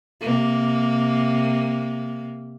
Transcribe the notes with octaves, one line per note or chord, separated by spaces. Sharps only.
C3 A#3